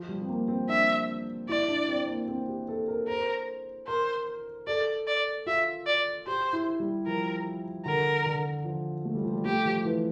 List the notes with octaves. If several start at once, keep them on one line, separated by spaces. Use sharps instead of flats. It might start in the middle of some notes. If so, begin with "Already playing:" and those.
Already playing: F3
G3
C4
A#3
C4
D4 E5
E4 D5
D4
C4
A#3
C4
G4
A4
A#4
A#4 C5
A#4 C5
A4 D5
D5
F4 E5
D5
G4 C5
E4
G3
F3 A#4
D3 A#4
D3
F3
A3
G3
F3
G3
A3 G4
F3
E3